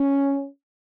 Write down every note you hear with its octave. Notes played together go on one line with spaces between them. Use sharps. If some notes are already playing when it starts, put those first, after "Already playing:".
Already playing: C#4